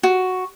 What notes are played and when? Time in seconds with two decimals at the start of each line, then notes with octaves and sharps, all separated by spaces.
0.03 F#4